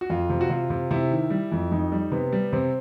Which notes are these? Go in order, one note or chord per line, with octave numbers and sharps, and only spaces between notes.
F#4
F2 F4
C3
F#4
C3 F4
C3
C3 E4
D#3
G3
F2
F2 D#4
G3
C3 B3
G3
C3 C4